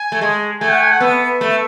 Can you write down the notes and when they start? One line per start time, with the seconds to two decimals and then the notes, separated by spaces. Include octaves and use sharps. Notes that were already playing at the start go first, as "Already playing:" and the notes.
Already playing: G#5
0.12 A3
0.21 G#3
0.61 A3 G#5
0.71 F#5
0.81 G#5
0.91 F#5
1.00 B3 E5
1.41 A3